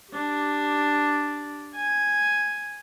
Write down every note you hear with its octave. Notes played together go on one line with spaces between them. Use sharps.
D4 G4
G#5